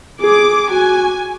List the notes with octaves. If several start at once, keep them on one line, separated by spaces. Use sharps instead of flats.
G#4 D6
F#4 G#5